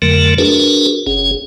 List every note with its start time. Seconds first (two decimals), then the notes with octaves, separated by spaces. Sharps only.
0.02 F2 D3 F#3 A3 A#4
0.38 D4 F#4 G#4 A#4 B4
1.06 F#1 C#4 G#4